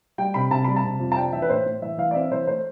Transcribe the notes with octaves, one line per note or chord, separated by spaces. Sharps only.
G3 G5
C3 B5
C3 A5
G3 B5
A5
C3
F2
A5
D4 G5
E3 E5
B4
A2 C5
A2
E3 E5
E3 F5
D5
C4 E5
E3 C5
A3 C5